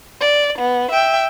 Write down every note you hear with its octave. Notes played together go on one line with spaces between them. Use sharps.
D5
B3
E5 G5